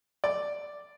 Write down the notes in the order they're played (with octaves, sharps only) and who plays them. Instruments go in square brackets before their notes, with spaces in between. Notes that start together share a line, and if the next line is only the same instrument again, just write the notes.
[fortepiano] D5